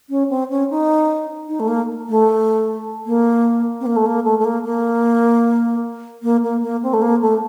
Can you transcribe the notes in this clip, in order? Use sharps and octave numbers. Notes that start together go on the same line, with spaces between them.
C#4
C4
C#4
D#4
D#4
A3
A#3
A3
A#3
C4
A#3
A3
A#3
A3
A3
A#3
A#3
A#3
A#3
A#3
C4
A3
A#3
A3